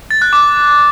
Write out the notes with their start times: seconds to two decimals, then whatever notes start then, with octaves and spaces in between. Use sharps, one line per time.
0.11 A6
0.22 F#6
0.33 D6